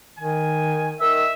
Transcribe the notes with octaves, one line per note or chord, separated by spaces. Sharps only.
D#3 G#5
D#3 E5 E6